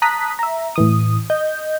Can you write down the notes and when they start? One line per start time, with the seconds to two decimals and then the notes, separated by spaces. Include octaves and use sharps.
0.02 A5 A#5 D#6 F#6 B6
0.39 E5 A#5
0.76 A2 E3 D#6
1.30 D#5 G6